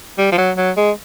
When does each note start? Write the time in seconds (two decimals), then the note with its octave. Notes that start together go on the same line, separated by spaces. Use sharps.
0.18 G3
0.32 F3
0.38 F#3
0.57 F#3
0.77 G#3